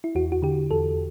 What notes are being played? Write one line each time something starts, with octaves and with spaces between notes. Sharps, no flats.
E4
E2 F#4
F#4
D3 G4
E2 A4